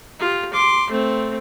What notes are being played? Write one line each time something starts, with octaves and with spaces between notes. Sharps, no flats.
F4 G4
C6 D6
A3 C4